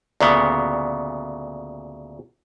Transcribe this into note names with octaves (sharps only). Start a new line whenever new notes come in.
D2 A#2 C#3 B3